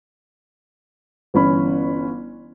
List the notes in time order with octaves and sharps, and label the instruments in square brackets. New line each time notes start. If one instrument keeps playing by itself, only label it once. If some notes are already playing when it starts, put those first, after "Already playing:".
[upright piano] G1 E3 C#4 B5